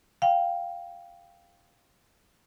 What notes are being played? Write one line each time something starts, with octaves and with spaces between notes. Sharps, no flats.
F5 G5